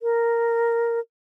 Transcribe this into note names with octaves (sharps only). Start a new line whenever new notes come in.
A#4